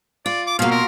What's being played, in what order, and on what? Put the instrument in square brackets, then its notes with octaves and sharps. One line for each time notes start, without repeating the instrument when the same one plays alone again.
[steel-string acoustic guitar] F4 [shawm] D5
[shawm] D6
[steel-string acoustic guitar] B2 A#3 [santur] F3 F#3 [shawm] F5
[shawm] A#4 [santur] C6